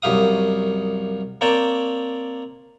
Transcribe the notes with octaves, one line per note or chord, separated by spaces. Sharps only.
C2 F#2 G4 F5 D#6
A#3 C4 C#5 D5 G5 A5